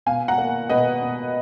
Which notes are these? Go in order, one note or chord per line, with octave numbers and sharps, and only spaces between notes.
B2 F5 G#5
F#5 A#5
A#3
B2 B4 D#5
B2